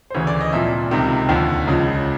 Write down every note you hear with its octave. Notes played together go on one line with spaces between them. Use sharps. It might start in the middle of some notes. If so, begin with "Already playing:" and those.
C5
D2 C#3 E3 C#5
D5
D#5
C2 A#2 F3 E5
C#2 C3 D#3
D#2 D3 F3
C#2 C#3 F3